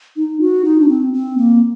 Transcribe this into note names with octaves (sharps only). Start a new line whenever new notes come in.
D#4
F#4
D#4
D4
C4
C4
A#3